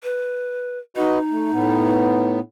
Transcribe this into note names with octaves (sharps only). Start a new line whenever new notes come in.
B4
D#4 F#4 B4 D#5
A3
A2 B3